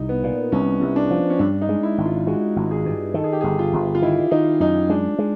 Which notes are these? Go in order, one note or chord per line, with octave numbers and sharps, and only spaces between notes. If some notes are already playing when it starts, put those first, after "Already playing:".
Already playing: C2 D#4
B3
A#2
C2 C#4
C2
D4
F3
C#4
G2 D4
D#4
G#3
E4
G#1
F4
G#3 F#4
G#1
G#4
G2
D#3 A4
G#4
G4
G#4
G1
F4
G1
F4
D#3 E4
D#3 D#4
F#2 D#4
G#3 D4
G#3